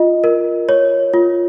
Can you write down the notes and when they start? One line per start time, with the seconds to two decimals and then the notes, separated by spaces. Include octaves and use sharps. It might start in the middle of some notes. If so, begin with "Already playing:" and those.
Already playing: F4 D#5
0.24 A#4
0.69 C#5
1.14 F4